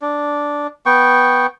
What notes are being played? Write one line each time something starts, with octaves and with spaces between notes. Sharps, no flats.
D4
B3 G5 C#6